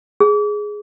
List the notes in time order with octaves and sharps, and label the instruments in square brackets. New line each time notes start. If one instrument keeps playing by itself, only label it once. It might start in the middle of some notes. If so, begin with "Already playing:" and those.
[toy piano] G#4